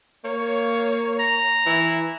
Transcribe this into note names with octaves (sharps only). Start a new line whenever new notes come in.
A#3 C#5
A#5
E3 E4